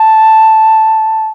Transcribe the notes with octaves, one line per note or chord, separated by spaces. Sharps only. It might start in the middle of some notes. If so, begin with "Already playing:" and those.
Already playing: A5